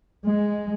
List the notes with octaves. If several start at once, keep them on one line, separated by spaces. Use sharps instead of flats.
G#3